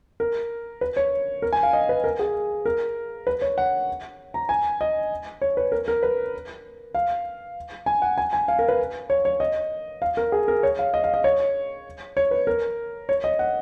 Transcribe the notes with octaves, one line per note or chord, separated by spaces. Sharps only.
A#4
B4
C#5
A#4
G#5
F5
D#5
B4
A#4
G#4
A#4
B4
C#5
F#5
A#5
G#5
D#5
C#5
B4
A#4
A#4
B4
F5
G#5
F#5
G#5
G#5
F5
A#4
B4
C#5
C#5
D#5
F5
A#4
G#4
A#4
C#5
F5
D#5
F5
D#5
C#5
C#5
B4
A#4
C#5
D#5
F#5